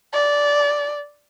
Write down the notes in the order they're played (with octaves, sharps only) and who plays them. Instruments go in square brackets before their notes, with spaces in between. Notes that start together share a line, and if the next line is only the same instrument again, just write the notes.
[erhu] D5